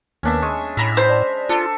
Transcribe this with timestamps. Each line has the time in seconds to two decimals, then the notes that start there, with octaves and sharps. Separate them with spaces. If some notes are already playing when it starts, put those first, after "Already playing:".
0.23 D#2 A#3 B3 C#4 D4 E5
0.42 G#3 C#6
0.77 A2 E5 A#5 B5
0.97 C5
1.09 D5 A5
1.49 D4 F4 A4